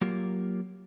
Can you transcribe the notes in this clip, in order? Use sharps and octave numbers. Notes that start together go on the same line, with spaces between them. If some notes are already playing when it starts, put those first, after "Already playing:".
F#3 A#3 F4 G4 A#4